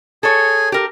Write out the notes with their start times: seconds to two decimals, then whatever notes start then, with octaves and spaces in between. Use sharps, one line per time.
0.23 G#4 A4 C#5 G#5
0.72 G4 A#4